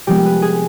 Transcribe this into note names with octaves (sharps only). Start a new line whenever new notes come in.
C3 F3 G#3 B3 G4
B4
G#4